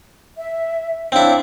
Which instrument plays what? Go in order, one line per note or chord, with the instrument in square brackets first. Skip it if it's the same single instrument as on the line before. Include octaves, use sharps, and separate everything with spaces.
[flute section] E5
[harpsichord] C4 E4 [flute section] D4 C#5 F5